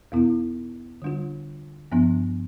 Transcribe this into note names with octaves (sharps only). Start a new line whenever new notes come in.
E2 B2 B3 E4
D3 G3 D4 F4
G2 F3 B3 D4